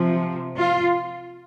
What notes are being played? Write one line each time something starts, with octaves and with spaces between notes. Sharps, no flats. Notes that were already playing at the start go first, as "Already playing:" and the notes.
Already playing: C3 F3
F4